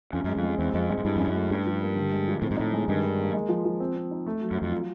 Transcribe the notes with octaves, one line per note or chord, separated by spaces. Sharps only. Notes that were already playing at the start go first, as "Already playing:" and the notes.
F2 C#4
F#2 G#3
F2
G#3
E2 C4
F2 G#3
G2 G#3
G#2
G2 E4
F2 C#4
F#2
A3
G2 G4
F3
A#3
D3
G#3
F3
A2 C4
G#2
A2 D#4
G#3
G2 D#3
D#3
A#3
G#3
F3
F3
C4
C4
D#4
A3
F#3
F#2
F2 F#3
F4